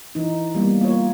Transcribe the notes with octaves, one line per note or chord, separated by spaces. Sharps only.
E3 D#4
G3 A#3 B3
A#3 F4 C#5